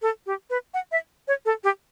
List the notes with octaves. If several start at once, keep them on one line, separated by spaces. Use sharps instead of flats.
A4
G4
B4
F#5
E5
C#5
A4
G4